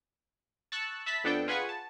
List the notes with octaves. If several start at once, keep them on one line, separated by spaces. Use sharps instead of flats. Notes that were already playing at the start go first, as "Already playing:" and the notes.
A5 C#6 E6 F#6
E5 A5 B5 B6
F2 B3 D4 A4 G5
F4 G#4 B4 F#5 G#5 C#6
A5